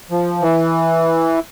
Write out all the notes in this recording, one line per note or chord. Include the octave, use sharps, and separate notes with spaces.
F3
E3